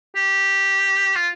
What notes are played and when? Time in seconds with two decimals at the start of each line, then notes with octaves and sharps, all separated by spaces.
0.16 G4
1.16 F4